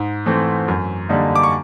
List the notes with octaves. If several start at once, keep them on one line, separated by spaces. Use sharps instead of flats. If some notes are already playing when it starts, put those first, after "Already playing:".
Already playing: G#2
E3 A3 C4
F#2
D3 G3 A#3 D#4
D6
C#6